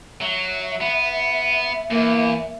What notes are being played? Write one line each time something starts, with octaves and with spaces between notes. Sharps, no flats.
F#3 E5
B3
E2 A#3